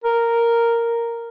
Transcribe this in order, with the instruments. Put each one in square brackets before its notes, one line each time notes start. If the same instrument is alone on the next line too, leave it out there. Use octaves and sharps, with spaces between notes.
[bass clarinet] A#4